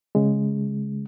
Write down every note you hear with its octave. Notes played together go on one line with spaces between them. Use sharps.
C#3 G#3